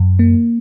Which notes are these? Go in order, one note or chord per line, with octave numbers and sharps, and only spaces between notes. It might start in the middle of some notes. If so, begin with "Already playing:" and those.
Already playing: F#2
A#3